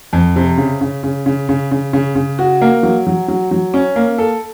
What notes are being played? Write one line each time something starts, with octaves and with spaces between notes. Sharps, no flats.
F2
C3
C#3
C#3
C#3
C#3
C#3
C#3
C#3
C#3
F#4
A#3
F#3
F#3
F#3
F#3
C#4
A#3
A4